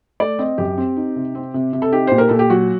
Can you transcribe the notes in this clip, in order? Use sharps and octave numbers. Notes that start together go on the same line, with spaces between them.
A3 D5
C4 D#5
F#2 G4
C4
D#4
C3
C4
C3
C3
A4
D#4 G4
A#2 C5
A#4
A#2 A4
G4
F#3 F#4